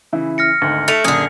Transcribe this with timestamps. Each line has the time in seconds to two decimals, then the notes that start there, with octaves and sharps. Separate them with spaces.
0.13 C#3 E3 E4
0.38 F6 A#6 C#7
0.61 G#1 D2 G#2
0.88 A3 A6 B6 C#7 F7
1.04 F#2 A#2 D3 G#4